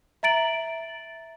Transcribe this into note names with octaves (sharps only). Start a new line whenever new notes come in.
E5 A#5 A6 D7 F#7